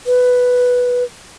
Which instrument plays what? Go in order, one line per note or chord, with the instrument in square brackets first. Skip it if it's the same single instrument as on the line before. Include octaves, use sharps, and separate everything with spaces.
[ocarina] B4